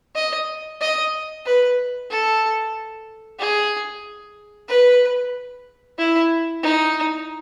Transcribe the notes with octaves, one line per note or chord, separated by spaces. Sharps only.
D#5
D#5
B4
A4
G#4
B4
E4
D#4